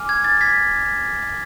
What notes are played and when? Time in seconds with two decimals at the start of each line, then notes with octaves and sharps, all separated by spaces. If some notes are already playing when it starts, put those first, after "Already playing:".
Already playing: G#5 D6 F6
0.09 G#6
0.24 A6
0.41 G#6 B6